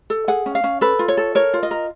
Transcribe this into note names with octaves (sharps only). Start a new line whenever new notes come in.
A4
G#4 F#5
C#4
F5
C#4
A4 B4
F4
C#5
A4
A#4 C#5
F4
D#5
A#4